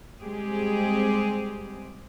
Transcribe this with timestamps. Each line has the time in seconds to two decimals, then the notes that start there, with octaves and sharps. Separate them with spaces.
0.21 G3 G#3 C4 G4 G#4